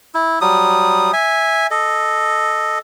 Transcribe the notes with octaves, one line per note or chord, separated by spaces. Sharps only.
E4
F#3 G3 D#6
E5 G#5
A4 D#5